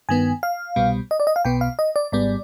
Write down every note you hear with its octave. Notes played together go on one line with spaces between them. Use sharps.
G2 D#3 B3 G#5
F5
C2 B2 G3 B3
D#5
D5
D#5
F5
B1 B2 B3 G5
F5
D#5
D5
G#1 G#2 G3 B3 D5